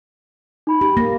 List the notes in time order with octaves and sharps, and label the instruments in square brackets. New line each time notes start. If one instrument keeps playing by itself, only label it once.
[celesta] D#4 B5
[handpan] G4
[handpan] A#3 [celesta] A#6